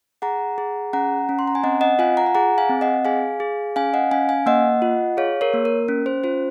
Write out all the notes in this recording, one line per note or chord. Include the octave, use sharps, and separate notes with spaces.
G#4 F#5 A#5
G#4
C#4 F#5 A#5
C#4
C6
A#5
G#5
C4 D#5 F#5
D#5 F#5
F4 F5 G#5
F#5 A#5
G#5
G#4 F#5 A#5
F5 G#5
C4
D#5 F#5
G#4 F5 G#5
G#4
C#4 F5 G#5
D#5 F#5
C#4 F5 G#5
F5 G#5
A#3 D#5 F#5
F4
G#4 C#5 F5
A#4 C#5
A#3
A#4
C#4
C5
F4 C5